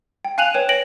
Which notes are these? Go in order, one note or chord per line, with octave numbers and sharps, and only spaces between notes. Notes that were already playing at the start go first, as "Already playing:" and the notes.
G5
F5 G#5 F#6 D#7 F7 F#7
B4 C#5 G5 E7
C#5 A#6 D7 F#7